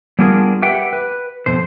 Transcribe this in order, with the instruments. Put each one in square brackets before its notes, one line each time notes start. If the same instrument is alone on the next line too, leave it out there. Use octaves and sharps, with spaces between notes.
[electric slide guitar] G3 B3 D4 F4 G#4 A#4
G4 B4 E5 F#5 G5
B4
F2 B2 C5